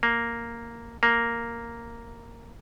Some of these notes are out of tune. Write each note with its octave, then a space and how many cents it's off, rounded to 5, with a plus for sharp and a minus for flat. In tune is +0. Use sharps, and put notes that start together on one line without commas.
A#3 -5
A#3 -5